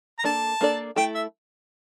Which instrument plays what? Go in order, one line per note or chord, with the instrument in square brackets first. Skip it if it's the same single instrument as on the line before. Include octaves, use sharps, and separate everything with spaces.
[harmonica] A#5
[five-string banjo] A#3 D4 A4 D5 [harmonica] A5
[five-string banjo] A#3 D4 A4 D5
[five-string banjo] A3 E4 A4 [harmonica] G5
[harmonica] E5